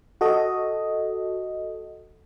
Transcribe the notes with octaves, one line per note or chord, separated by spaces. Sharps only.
F#4 A4 D#5